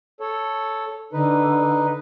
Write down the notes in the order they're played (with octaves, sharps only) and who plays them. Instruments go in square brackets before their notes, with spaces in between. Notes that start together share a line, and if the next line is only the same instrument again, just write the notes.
[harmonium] A4 C#5
[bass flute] D3 [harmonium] D#4 B4